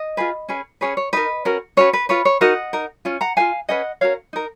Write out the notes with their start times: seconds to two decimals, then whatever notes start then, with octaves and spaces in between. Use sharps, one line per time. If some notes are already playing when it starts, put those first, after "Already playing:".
Already playing: D#5
0.17 F4 G#4 B4
0.49 C#4 G#4 B4
0.81 C#4 G#4 B4 C#5
0.97 C#5
1.13 D#4 A#4 B4 D#5
1.45 C#4 F#4 A#4
1.77 C#4 F#4 B4 C#5
1.93 B4
2.09 F4 B4 C#5
2.25 C#5
2.41 D#4 F#4 A#4 D#5 F#5
2.73 D#4 A#4
3.05 C#4 F4
3.21 F#5 A#5
3.37 B4 F5 G#5
3.40 F4
3.69 C#4 G#4 B4 D#5 F#5
4.01 C#4 F#4 A#4 C#5 F5
4.33 D#4 A#4